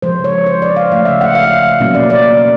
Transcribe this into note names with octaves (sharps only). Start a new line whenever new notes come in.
C#3 F3 G#3 C5
C#5
C5
D5
F5
C#3 F3 A3 F5
E5
F#5
F5
B2 F#3 A#3 C#4
D5
D5